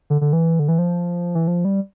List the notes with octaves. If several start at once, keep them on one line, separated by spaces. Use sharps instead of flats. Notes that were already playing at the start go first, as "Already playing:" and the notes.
D3
D3
E3
D3
E3
F3
E3
F3
G3